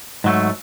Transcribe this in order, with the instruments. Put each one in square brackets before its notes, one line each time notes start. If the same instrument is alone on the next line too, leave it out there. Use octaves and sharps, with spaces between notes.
[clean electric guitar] G#2 F#3 A3